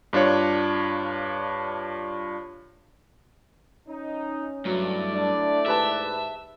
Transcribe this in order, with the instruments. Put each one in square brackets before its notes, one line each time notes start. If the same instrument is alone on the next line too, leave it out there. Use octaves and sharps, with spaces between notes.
[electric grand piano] G2 D4 F4 C#5
[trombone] C#4 [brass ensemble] D#4
[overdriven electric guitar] G2 [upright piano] F#3 [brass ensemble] A3 E4 D5
[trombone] D4
[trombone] G#2 [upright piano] G4 B4 A5 [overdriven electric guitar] E5